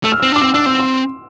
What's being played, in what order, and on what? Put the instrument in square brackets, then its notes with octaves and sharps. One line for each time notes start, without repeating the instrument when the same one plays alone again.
[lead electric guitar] A3 [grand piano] E6
[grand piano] F6
[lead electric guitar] C4 [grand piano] E6
[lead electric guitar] D4 [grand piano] D6
[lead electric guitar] C4 [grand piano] E6
[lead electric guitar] D4 [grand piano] E6
[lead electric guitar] C4 [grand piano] E6
[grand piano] C6